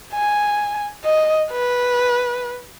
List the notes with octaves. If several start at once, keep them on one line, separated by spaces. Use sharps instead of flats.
G#5
D#5
B4